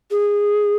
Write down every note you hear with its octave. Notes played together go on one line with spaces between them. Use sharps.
G#4